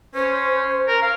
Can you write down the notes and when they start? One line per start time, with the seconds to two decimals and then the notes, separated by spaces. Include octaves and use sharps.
0.15 C#4 C5
0.88 A#4
1.02 F5